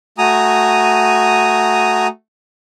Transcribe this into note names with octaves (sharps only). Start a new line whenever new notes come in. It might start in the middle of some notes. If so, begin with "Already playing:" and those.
A3 F#4 G#5 A#5 D#6